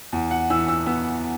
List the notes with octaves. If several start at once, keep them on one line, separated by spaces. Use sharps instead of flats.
E2
F#5
E3 E6
E6
B3 E6